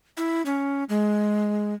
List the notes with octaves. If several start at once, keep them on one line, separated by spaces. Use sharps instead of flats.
E4
C#4
G#3